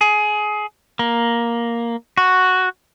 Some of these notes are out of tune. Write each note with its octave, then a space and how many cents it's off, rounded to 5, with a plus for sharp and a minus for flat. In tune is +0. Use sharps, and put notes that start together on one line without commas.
G#4 +20
A#3 +5
F#4 +0